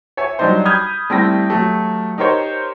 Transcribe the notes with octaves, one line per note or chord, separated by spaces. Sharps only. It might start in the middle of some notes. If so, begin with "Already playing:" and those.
C#5 E5 G#5
F#3 G3 D4 D#4 C5
B5 D#6 F6 G6 G#6
G3 A3 C4 E4 G5 A#6
F#3 A3 G4
D#4 G4 A#4 C5 C#5